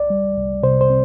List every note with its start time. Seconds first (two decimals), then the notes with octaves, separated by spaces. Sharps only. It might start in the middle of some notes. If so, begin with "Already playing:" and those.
Already playing: C2 D5
0.10 G3
0.37 C2
0.63 C3 C5
0.81 C5
0.90 C4